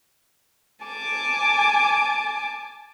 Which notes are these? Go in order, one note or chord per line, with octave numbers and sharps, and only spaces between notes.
G#5 A5 D6